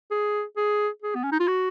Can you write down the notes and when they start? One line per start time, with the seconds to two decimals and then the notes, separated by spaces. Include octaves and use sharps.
0.11 G#4
0.56 G#4
1.02 G#4
1.15 B3
1.24 C#4
1.32 D#4
1.40 F4
1.48 F#4